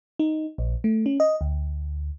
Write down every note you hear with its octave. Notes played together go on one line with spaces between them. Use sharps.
D#4
A#1
A3
C#4
D#5
D2